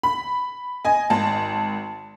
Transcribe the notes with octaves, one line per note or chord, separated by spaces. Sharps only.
B5
D#5 G#5
G#1 A5